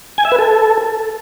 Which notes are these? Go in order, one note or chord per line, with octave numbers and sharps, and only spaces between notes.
G#5
E5
B4
A4